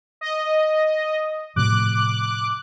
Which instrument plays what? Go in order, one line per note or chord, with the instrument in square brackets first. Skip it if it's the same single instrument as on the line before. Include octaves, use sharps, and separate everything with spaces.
[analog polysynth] D#5
[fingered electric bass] A2 C3 F3 [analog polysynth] D6 F#6